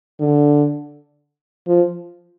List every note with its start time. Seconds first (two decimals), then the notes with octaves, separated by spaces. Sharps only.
0.20 D3
1.67 F3